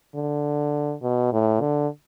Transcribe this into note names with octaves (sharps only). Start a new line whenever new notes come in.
D3
B2
A2
D3